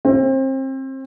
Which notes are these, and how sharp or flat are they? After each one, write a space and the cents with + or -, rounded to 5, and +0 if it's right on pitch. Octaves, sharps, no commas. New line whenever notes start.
C4 +30